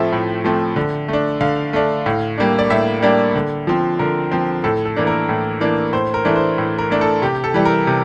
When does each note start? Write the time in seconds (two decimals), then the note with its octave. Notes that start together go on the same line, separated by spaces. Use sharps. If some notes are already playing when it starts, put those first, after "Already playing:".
Already playing: A2 F3 A3 C4 E5
0.12 A2
0.44 F3 A3 C4
0.76 D3
1.08 A3 D4
1.41 D3 F5
1.73 A3 D4
2.06 A2
2.38 G3 A#3 D4
2.59 D5
2.70 A2 E5
3.02 G3 A#3 D4
3.35 D3
3.67 F3 C4
3.99 D3 A#4
4.32 F3 C4
4.64 A2 A4
4.86 A4
4.96 E3 A#3 D4
5.07 A#4
5.29 A2
5.60 E3 A#3 D4
5.93 A2 C5
6.14 A#4
6.25 E3 A3 D4
6.36 C5
6.58 A2
6.78 A#4
6.90 E3 A3 D4
7.01 A4
7.22 C3 G4
7.44 A4
7.54 E3 G3
7.65 A#4
7.87 C3